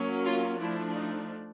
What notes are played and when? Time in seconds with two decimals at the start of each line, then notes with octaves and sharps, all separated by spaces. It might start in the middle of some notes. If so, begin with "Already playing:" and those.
Already playing: F#3 A#3 C#4
0.25 F4
0.60 F3 A3 D4 E4
0.95 D#4